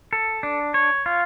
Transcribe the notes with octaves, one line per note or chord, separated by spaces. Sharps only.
A4
D4
C#5
F4